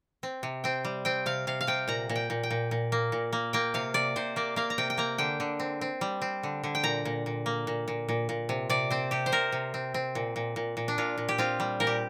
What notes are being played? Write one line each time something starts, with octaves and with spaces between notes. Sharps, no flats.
C4
C3
C4 G5
G3
C4 G5
C3 F5
C3 F5
F5
C3 G5
A#2 A#5
A#2
G5
A#2
G5
A#2
A#2
A#3
A#2
A#3
A#3 G5
C3 F5
C3 D5
C3 C5
A#3 D5
A#3 F5
A#5
C3 G5
G5
A#3 A#5
D3 G5
D3
C4
C4
G3
C4
D3
D3
G5
A#2 A#5
A#2
A#2
A#3
A#2
A#2
A#2
A#2
C3
C3 D5
C4 C5
C3 G4
C5
C3 A#4
C3
C4
C4
A#2
A#2
A#2
A#2
D4
A#2 F4
A#2
G4
C4 F4
G3
A#2 A#4
G4